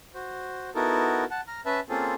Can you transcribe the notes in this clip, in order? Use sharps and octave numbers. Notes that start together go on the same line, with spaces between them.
F#4 C5
B3 D#4 E4 F#4 A4 A#4
F#5 A5
A#5 F6
C#4 B4 E5 A5
A#3 C4 C#4 F4 G#4 A4